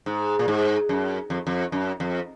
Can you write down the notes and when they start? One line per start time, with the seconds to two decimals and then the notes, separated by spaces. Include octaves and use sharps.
0.06 G#2
0.39 A#2
0.48 G#2
0.89 F#2
1.30 F2
1.47 F2
1.72 F#2
2.00 F2